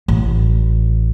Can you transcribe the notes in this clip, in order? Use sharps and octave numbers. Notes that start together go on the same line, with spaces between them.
A1